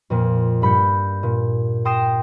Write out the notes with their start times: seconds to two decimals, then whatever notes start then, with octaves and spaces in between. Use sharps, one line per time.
0.10 F2 A#2
0.62 G2 B5 G6 C#7
1.23 A#2
1.85 G5 C6 D#6 A#6 C7 E7